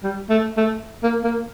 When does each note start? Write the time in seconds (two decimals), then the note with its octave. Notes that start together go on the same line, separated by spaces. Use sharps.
0.03 G3
0.29 A3
0.57 A3
1.03 A#3
1.24 A#3